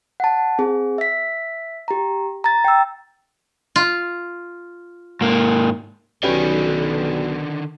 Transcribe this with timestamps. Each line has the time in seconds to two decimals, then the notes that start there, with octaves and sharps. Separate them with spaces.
0.20 F#5 A5
0.59 C4 G#4
0.98 E5 B6
1.88 G4 A#5
2.44 A#5 A6
2.64 G5 E6
3.76 F4
5.21 G#2 A#3
6.23 B1 D3 D#3 C#4 F#4 G4 B4 D5